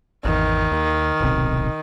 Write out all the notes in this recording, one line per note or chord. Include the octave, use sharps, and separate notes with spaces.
G#1 E2 D#3
D#2
D1 B1 C3